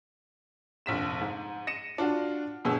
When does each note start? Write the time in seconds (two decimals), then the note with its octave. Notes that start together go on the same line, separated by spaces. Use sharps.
0.86 F1 A#1 B6 E7
1.21 G#2
1.67 A#6 C#7 D#7 E7
1.98 D4 F4 F#4
2.65 G1 B2 G#4 E6